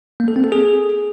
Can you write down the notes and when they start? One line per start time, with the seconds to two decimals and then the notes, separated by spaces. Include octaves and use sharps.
0.20 A#3
0.28 A4
0.36 C4
0.44 A4
0.52 G#4